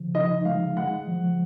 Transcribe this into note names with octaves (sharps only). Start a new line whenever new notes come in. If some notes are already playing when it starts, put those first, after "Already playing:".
Already playing: C#3 F3
D#4 D#5
G#3 F5
G#3 F#5
F3